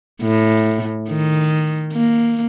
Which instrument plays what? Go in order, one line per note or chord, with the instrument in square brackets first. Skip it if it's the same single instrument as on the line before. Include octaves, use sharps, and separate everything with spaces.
[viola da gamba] A2
D#3
A#3